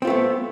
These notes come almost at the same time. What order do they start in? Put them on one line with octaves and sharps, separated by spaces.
C4 F4 A3 B3